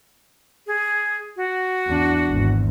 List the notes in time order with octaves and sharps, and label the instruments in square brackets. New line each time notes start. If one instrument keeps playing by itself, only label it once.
[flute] G#4
F#4
[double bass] E2 D4
G#1 E2